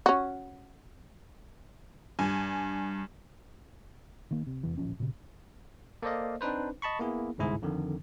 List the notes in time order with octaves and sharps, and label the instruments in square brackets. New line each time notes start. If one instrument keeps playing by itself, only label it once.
[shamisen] C#4 F#4
[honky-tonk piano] G2 G#5
[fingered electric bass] D#3 A#3
C3
F1 E2 E3
D1 A#1 F3 C#4
A#2 C#3
[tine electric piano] A#3 A4 C5 D5 D#5 F5
C4 D4 D#4 B4 C5
D#5 A5 B5 C#6
A#3 B3 E4 G#4
G1 C2 G#2 E4 G#4
F2 D3 D#3